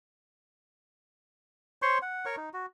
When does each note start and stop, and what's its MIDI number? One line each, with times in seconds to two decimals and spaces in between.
1.82 1.98 72
1.82 1.98 73
1.82 1.98 84
1.82 1.98 85
2.02 2.25 78
2.25 2.36 70
2.25 2.36 73
2.25 2.36 85
2.37 2.49 63
2.53 2.66 66